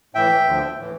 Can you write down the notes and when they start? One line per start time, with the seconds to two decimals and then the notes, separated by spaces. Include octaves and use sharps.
0.14 A2 E3 E5 G5
0.47 D2 D3 F3
0.78 A2 E3